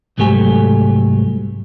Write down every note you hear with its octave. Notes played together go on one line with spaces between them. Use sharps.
C2 G#2 F#3 A3 G4 G#5